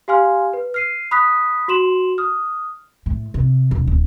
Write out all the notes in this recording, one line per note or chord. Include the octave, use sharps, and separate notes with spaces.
G4 F5 G#5 C6 F6
B4
F6 C7 D#7
B5 D#6 F#6 B6
F#4 C6 E7 F#7
D#6 F6
A2
C3
E1
D1